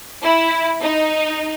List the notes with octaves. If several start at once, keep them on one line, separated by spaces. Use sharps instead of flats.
E4
D#4